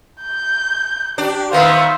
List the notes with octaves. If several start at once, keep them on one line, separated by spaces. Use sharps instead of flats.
G6
D4 G4
D#3 B3 C5 E5 F5